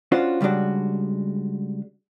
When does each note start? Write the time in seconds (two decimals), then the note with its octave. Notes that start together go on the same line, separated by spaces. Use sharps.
0.12 C#4 D4 F4 F#4 C5
0.41 C#3 G3 G#3 D4 F#4